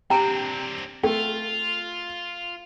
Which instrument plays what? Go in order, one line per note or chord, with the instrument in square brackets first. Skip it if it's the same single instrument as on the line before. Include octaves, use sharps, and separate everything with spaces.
[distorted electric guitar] C4 D4 [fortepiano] G4 [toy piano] G5 A#5
[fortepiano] A3 [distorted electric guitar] F4 [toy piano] G5